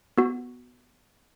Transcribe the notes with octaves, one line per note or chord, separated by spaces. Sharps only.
B3 F#4